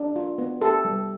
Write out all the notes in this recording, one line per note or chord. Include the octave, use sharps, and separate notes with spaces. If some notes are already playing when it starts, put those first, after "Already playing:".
Already playing: D4
F4
B3
G4 A4
G3